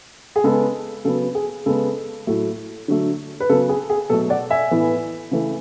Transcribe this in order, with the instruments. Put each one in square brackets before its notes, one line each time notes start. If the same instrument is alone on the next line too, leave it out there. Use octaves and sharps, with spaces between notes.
[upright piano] G#4
C#3 G#3 B3 A4
C#3 F#3 B3 A4
G#4
C#3 G#3 B3 A4
A2 F#3 A3
D3 F#3 A3
B4
C#3 F#3 B3 A4
G#4
G#4
B2 F#3 A3 A4
D5 F#5
E5 G#5
A2 E3 B3
C#3 E3 A3